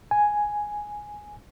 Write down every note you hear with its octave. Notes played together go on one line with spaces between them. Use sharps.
G#5